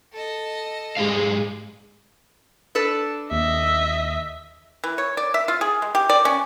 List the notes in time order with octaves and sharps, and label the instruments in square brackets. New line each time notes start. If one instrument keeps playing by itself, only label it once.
[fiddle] A4 D#5
[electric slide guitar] G#2 G4 F5 [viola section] G#3
[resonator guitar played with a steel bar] D4 A4 B4
[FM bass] D#2 [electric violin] D#5 E5
[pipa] E3
C#5
D5
E5
F4
G#4
G#3
G4
D5
C#4